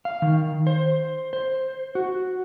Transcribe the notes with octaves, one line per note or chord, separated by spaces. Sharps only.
F5
D#3
C5
C5
F#4